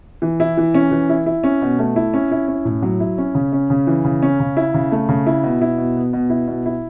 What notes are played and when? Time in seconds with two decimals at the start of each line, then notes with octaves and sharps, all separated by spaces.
0.22 E3
0.40 E4
0.58 E3
0.74 C#4
0.91 E3
1.09 E4
1.26 E4
1.44 C#4
1.62 B2
1.79 A3
1.96 E4
2.14 C#4
2.31 E4
2.48 C#4
2.65 A2
2.82 F#3
3.00 E4
3.18 C#4
3.35 C#3
3.52 C#4
3.70 C#3
3.87 E3
4.05 C#3
4.23 C#4
4.40 C#3
4.57 E4
4.74 C#3
4.92 A3
5.09 C#3
5.26 E4
5.43 B2
5.61 E4
5.78 B2
5.96 B3
6.13 B2
6.30 E4
6.48 B2
6.66 E4